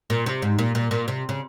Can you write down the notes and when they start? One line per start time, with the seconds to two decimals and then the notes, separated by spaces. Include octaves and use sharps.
0.10 A#2
0.26 C3
0.42 G#2
0.59 A#2
0.75 A#2
0.91 A#2
1.08 C3
1.29 C#3